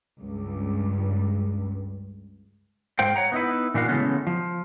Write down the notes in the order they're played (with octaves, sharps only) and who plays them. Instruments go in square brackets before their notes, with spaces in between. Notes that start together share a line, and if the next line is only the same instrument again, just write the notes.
[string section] C#2 G2
[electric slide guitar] G#2 C5 F5 G5
C#5 F#5 A#5
B3 D#4 E4 B4
A#2 E3 D4 F#4 F5
C#3 E3 G#3 A3 B3 C#4
F3